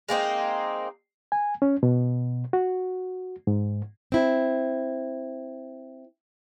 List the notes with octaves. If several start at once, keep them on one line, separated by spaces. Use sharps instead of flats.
G#3 A#3 C4 D#4
G#5
C#4
B2
F#4
G#2
C4 E4